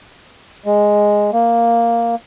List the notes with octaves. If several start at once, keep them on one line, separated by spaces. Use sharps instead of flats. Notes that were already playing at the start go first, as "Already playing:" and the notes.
G#3
A#3